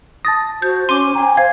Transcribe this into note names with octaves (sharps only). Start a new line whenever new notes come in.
A5 D#6 A6 A#6
F#4 C5 G6
C#4 C6 D6 D#7
G5 G#5 A#5
C5 F5 G#6